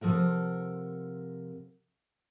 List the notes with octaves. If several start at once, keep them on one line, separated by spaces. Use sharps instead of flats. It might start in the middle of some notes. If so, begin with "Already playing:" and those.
C3 F3 A4 A#4 F#5